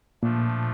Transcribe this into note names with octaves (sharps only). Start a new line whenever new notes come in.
A#2 F3 A3 D4